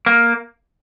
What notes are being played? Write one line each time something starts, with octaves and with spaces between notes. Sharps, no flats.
A#3